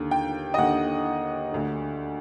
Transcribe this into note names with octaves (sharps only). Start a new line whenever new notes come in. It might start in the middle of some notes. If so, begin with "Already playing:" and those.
Already playing: D#2 D3
G5
D#5
D#2 D3 F#5
D2 D3